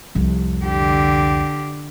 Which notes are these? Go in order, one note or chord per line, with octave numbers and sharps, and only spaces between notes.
C2 F2
D3 G4